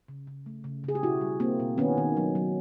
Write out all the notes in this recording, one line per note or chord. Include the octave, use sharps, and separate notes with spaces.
C#3
C#3
A3
C#3
C#3 G#4
G4
B2 E4 F#4
G3
A#3 C4
B2
D#3 B3 C#4
D#3
F#3
F#3